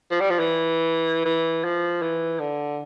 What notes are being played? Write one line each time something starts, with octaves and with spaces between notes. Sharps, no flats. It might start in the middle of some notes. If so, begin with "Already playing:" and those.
F3
G3
F3
E3
E3
F3
E3
D3